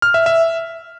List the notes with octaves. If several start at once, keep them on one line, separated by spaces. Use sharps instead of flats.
F6
E5
E5